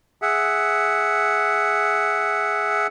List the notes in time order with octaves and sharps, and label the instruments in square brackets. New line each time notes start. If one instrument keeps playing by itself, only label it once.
[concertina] G#4 E5 F#5